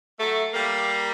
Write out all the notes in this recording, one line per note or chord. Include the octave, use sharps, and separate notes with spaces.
F#3 A3
G3 A#3